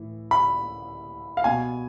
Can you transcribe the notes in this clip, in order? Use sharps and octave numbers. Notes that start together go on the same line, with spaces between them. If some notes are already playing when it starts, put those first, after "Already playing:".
Already playing: A2 E3
B5
F5
B2 G#5